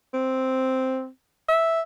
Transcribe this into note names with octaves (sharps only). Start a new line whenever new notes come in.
C4
E5